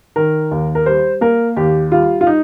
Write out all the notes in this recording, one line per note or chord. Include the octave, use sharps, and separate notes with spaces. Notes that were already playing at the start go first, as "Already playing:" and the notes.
D#3 A#4
D#2
A#4
G3 C5
A#3 A#4
D#2 G4
G3 F4
F4
D#4